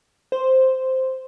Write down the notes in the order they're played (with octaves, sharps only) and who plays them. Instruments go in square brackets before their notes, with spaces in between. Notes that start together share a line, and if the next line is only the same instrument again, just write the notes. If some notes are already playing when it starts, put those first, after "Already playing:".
[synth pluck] C5